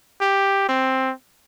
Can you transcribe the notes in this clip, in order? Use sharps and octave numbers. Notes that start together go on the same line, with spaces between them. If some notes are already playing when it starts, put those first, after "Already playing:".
G4
C4